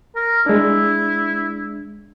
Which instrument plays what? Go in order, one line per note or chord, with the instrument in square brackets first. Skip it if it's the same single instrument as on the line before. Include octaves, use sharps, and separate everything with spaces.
[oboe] A#4
[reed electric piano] G#3 D4 [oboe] E4